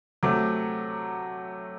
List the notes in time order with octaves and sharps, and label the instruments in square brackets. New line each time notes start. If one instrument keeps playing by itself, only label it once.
[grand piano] C3 F#3 A3 D6